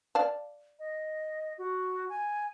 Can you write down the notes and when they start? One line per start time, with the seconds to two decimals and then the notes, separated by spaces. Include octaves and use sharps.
0.15 D5 F5 A5
0.79 D#5
1.58 F#4
2.09 G#5